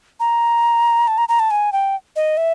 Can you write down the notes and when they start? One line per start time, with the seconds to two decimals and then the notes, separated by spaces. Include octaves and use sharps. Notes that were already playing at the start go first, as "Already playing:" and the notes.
0.20 A#5
1.08 A5
1.18 A#5
1.29 A#5
1.40 A5
1.51 G#5
1.73 G5
2.16 D#5
2.37 E5